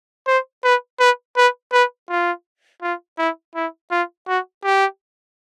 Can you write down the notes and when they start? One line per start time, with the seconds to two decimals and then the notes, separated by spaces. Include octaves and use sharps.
0.27 C5
0.64 B4
1.00 B4
1.37 B4
1.73 B4
2.10 F4
2.83 F4
3.18 E4
3.56 E4
3.91 F4
4.28 F#4
4.64 G4